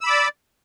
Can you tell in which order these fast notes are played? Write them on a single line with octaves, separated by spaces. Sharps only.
E6 B5 D6 D5